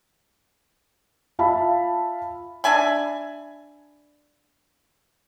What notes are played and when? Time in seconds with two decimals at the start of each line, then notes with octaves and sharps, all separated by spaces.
1.39 F4 E5 F5 A5 B5
2.64 D4 E5 G#5 B5